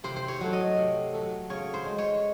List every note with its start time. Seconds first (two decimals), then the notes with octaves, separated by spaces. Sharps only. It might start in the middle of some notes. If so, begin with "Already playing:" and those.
0.04 C3 C5
0.16 C5
0.28 C#5
0.41 F#3 A3
0.53 D#5
0.77 C3
1.13 F#3 A3
1.50 C#3 C#5
1.74 C5
1.86 G#3
1.98 C#5